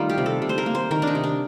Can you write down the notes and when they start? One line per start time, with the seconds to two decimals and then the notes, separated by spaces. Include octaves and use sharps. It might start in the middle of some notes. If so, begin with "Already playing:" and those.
Already playing: D#3 G3 A3 D#4 F4
0.10 G4
0.18 C3
0.26 A4
0.42 C3
0.49 C5
0.58 A#4
0.66 A#3
0.75 C5
0.91 D#3 A#4
1.02 D4
1.07 D#4
1.15 C3
1.24 D4